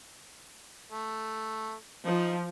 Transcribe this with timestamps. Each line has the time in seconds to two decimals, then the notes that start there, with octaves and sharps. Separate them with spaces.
0.92 A3
2.06 F3 D#4